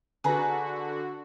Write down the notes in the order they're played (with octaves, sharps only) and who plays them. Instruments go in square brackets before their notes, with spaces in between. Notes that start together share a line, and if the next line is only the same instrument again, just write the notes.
[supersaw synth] D3 F#4 [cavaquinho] G#4 B4 A#5